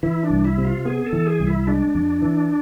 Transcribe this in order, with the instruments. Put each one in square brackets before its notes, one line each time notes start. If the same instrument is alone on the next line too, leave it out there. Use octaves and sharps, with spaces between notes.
[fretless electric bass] E3 [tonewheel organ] E4
[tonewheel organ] D4
[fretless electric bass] C2
[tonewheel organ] E4
[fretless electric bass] C3
[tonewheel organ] F4
[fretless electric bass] B3 [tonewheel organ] G#4
[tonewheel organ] A4
[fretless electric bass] E3
[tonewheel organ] G#4
[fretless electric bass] C2
[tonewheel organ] E4
[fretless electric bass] G#3 [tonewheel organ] D4
[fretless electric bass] F2
E3